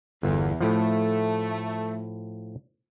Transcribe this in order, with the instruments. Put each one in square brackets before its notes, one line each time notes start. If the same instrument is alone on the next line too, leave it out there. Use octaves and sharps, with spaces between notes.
[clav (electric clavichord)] G1 [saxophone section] E2
[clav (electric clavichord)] A2 F3 [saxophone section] A3